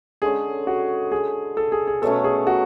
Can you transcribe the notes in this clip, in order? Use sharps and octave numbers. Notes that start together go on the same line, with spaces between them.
D3 G#3 C#4 G#4
F#4
G#4
A4
G#4
G#4
B2 F#3 A3 C#4 A4
G#4
F#4